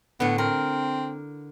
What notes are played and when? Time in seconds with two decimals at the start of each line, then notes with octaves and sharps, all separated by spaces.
0.20 A2 D3 B3
0.38 C4 A#4